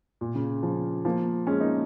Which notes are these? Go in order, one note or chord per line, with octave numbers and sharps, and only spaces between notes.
A#2
C#3
C#3 F3
F3 A#3
G#3 C#4
A#3 D#4